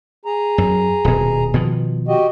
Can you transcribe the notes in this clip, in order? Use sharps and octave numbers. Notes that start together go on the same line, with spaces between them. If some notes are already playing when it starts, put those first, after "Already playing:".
G#4 A#5
F#2
D#1 B2
B2 D#3 F3
F#4 G4 D#5